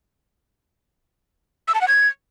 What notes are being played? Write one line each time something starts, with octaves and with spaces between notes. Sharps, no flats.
E6
A5
F#5
G#6